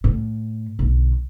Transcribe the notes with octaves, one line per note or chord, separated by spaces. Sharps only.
A2
B1 D3